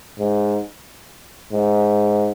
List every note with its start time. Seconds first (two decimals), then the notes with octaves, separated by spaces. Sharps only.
0.19 G#2
1.52 G#2